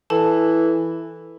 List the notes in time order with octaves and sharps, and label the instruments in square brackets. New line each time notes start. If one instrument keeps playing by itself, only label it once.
[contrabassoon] E3 [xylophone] A4 A5